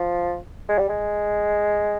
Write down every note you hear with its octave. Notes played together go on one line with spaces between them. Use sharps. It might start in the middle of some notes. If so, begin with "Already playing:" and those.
Already playing: F3
G#3
G3
G#3